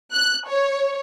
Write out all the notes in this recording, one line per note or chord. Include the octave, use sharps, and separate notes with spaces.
F#6
C#5